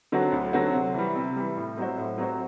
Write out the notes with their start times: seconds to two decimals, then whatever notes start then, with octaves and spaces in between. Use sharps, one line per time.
0.12 D3 F#3 C4 F#4
0.32 D2
0.53 D3 F#3 C4 F#4
0.73 C3
0.94 E3 G3
1.15 C3
1.36 E3 G3
1.57 A2
1.77 F#3 C4 F#4 C5
1.98 A2
2.18 F#3 C4 F#4 C5